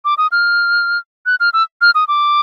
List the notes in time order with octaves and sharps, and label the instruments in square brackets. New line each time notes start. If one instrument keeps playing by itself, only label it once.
[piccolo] D6
D#6
F6
F#6
F6
E6
F6
D#6
D6